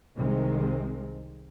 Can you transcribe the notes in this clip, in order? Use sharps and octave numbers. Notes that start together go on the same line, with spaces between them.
C2 C3 D#3 G#3 C4